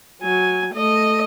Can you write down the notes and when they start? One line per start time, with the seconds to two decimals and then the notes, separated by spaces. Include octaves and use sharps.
0.22 F#3 G#5
0.74 A3 D#5